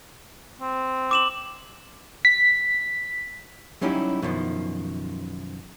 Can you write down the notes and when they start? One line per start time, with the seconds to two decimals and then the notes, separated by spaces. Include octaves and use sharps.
0.60 C4
1.11 D6 E7 F#7
2.25 B6
3.81 F#3 G3 C#4 D#4 E4 G4
4.22 F#2 B2 D#3 F3